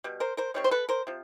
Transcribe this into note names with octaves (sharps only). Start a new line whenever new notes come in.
B2 G3
A#4 C5
A#4 C5
D#3 G3 C4 C#5
C5
A4 B4
A#4 C5
C3 F3